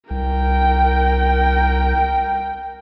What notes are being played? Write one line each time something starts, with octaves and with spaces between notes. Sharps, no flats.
C2 A#4 G5